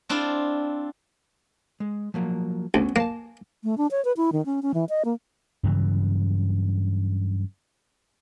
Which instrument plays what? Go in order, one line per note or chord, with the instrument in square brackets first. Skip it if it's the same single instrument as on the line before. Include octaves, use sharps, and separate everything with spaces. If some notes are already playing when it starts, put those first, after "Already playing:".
[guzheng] C4 D4 E4 F4
[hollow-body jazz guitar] G#3
F3 F#3 A#3
[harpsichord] D2 [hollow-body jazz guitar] B3 C#4
[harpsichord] A#3 [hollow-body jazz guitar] G#5 A5
[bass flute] A3
D4
C#5
B4
E4
D#3
C#4
C#4
E3
D#5
A#3
[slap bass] G2 C#3 E3 F#3